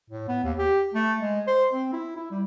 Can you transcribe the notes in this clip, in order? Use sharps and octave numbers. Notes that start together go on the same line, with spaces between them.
A2
B3
D#2
G4
A3
G#3
C5
C4
E4
E4
G3